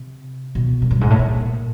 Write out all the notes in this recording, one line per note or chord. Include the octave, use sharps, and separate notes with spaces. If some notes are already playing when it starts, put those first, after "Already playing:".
Already playing: C3
B2
F#2
G2
G#2
A2
A#2